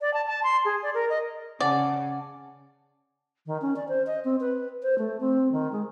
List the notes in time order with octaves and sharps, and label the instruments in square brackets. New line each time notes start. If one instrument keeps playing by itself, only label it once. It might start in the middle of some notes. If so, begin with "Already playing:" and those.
[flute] D5
A5
A5
C6
G#4
D5
A#4
D#5
[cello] C#3 [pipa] D5 [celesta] F#5 G#5 A5
[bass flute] D#3
C#4
D5
C5
D#5
C4
B4
C5
A3
C4
D#3
G#3